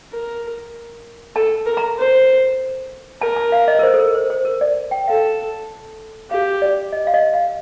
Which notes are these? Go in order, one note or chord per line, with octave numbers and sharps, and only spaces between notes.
A#4
A4 A5
A#4
A#5
C5
A#4 A5
A5
F5
D#5
A#4
C5
A4
A#4
C5
C5
A#4
D5
G5
A4 F5
G4 F5
D5
D#5
F5
D#5
F5